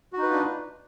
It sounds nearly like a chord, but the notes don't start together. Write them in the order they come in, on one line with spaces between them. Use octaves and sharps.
F#4 D#4 B4 F4 D4